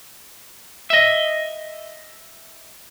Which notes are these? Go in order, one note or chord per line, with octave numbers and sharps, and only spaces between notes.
D#5 E5